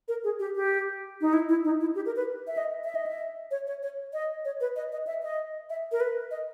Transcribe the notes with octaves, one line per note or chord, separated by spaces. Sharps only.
A#4
G#4
G4
G4
D#4
E4
E4
D#4
E4
G4
A#4
B4
E5
D#5
E5
D#5
E5
C#5
C#5
C#5
D#5
C#5
B4
D#5
D#5
E5
D#5
E5
A#4
B4
D#5